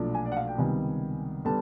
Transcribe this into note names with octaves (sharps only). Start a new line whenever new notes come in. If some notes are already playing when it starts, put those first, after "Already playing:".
Already playing: B1 A#2 F3 A3 D4
G#5
D5
F#5
F5
G5
C#2 C3 D#3 G3 B3 G#5
D3 G3 B3 A5